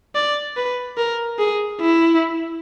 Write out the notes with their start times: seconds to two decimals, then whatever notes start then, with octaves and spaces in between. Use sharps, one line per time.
0.15 D5
0.57 B4
0.97 A#4
1.39 G#4
1.80 E4